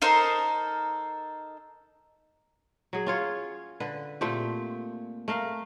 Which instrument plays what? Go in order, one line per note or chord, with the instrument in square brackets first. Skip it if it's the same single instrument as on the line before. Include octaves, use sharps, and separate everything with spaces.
[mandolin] D#4 A4 A#4 C5
[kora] F#3 G#4
C#4 F4 C#5
D3 B4
A#2 A3 C4 G4
A3 A#4 F5